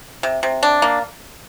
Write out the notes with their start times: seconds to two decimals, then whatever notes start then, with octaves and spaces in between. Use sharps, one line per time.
0.23 C3
0.43 C3
0.63 D4
0.82 A#3